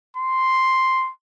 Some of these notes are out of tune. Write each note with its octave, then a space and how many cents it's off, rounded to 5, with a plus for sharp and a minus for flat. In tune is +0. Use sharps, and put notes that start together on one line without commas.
C6 +0